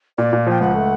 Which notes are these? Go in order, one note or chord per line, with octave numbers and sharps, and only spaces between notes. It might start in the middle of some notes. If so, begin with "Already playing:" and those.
A#2 D5
A#2
F3 G5
C#2 F#5
A3